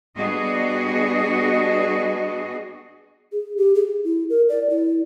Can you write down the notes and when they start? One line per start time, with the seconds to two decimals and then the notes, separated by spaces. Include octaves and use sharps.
0.16 G3 B3 D4 F#4 G#4 D#5
3.32 G#4
3.57 G4
3.75 G#4
4.04 E4
4.30 A#4
4.49 D5
4.70 E4